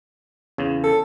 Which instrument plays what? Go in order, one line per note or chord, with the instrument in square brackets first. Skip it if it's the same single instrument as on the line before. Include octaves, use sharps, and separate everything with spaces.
[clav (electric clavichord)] E2 C#3
[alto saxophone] A4